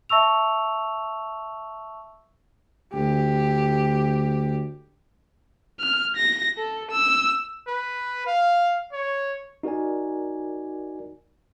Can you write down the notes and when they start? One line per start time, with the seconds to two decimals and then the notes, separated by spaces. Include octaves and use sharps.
0.09 E5 A5 C#6 E6 F7
2.94 D2 G4
5.80 F6
6.16 A#6
6.58 A4
6.91 E6
7.67 B4
8.26 F5
8.92 C#5
9.63 D#4 F#4 A#4 D5 G#5